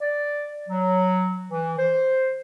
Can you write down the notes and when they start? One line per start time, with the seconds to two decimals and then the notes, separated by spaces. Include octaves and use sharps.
0.01 D5
0.69 F#3
1.51 E3
1.78 C5